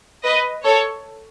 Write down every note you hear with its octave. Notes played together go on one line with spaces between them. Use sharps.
B4 D#5
A4 C#5